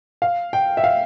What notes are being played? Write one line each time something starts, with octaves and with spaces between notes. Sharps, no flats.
F5
G5
E5
F5